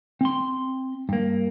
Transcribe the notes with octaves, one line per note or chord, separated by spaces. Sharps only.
C4 C6
G2 A#3